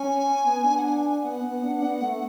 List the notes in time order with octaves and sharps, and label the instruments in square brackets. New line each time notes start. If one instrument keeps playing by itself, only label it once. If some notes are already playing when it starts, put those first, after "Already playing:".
Already playing: [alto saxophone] C#4 [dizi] G#5
[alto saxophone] B3
D4
[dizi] F#5
G#5
G#5
G#5
[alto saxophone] B3 [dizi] F#5
[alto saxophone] B3
D4
B3
A3